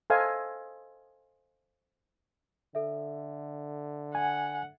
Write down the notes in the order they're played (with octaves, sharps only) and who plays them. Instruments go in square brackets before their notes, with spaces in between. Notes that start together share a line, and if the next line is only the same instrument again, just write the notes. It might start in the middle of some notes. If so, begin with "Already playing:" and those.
[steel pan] A4 C5 D#5 F5 G#5
[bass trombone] D3 [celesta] A4 E5
[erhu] F#5 [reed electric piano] G#5